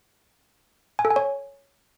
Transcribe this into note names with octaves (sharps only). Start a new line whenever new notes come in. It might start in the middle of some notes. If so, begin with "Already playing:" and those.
G#5
A4
G#5
C#5